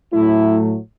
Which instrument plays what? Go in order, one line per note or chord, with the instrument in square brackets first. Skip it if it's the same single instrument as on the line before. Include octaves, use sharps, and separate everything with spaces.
[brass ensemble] A2 F#3 A3 E4